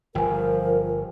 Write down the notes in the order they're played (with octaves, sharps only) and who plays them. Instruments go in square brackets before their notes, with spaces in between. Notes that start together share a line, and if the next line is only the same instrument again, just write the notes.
[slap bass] G1 [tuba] F3 [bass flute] A#4 [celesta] G5 G#5